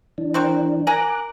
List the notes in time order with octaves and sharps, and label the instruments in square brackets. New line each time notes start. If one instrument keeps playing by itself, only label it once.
[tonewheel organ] E3 D4
[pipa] C4 F#4 A#4
[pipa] A#4 G#5 A#5 [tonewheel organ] D6 F#6